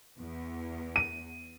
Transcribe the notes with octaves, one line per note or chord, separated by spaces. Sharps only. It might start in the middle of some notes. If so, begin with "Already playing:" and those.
E2
D#7